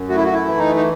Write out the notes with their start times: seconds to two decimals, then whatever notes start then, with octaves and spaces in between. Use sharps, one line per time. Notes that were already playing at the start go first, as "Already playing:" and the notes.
Already playing: F#2
0.09 A3 F#4
0.17 E4
0.24 F#4
0.33 E4
0.46 E3
0.58 D#4
0.76 D#4